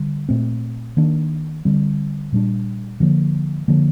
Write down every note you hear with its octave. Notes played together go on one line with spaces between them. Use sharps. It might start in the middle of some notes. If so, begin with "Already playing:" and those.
Already playing: D3 G3
A#2 A3 C4
D#3 A#3 D4
D3 G3 C4
A#2 G3 D4
D3 F3 A#3
D3 F3 A#3 D4